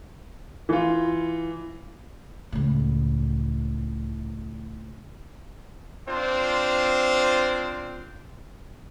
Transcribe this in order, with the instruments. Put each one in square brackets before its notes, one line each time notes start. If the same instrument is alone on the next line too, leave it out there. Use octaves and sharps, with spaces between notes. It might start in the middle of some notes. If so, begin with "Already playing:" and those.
[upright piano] E3 F4
[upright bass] C#2 A2
[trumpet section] C4 D4 F4 C5